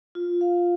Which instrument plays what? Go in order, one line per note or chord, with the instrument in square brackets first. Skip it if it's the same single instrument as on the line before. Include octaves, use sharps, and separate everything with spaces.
[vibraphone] F4
F5